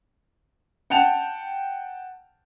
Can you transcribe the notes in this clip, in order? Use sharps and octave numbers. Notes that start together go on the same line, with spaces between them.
F#5 G5 A5 F7